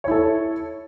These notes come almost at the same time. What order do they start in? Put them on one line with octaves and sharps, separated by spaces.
C#5 E4 A4